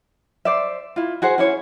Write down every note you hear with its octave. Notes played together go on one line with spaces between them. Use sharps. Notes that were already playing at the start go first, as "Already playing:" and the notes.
C5 D5 E5
E4 F4
F#4 G#4 C5 F#5
C#4 E4 C#5